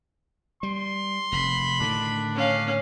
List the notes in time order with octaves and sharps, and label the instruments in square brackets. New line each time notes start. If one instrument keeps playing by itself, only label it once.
[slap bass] G3 [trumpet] C6
[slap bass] F1 [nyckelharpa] B5
[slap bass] A2 D3 D#3 [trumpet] D4
[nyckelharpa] C#4 F5